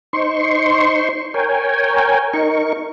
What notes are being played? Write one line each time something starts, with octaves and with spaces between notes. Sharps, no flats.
D#4 C5 C6 C#6
A#4 C#5 G5 G#5
D#4 A#4 C#6